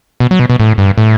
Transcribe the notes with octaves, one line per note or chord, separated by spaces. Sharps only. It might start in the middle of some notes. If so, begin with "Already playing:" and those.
B2
F#3
B2
B2
A2
G2
A2